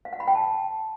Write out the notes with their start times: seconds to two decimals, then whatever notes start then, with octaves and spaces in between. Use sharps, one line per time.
0.05 F5
0.13 F#5
0.20 B5
0.28 G5
0.35 A5